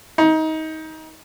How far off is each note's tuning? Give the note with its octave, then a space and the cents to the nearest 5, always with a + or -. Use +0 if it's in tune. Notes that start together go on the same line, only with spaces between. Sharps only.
D#4 +25